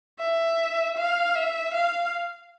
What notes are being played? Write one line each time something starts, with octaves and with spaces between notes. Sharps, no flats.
E5
F5
E5
F5